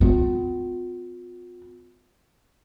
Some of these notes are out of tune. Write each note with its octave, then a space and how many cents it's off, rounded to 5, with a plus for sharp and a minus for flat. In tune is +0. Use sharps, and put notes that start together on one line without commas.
B3 +45 F4 +40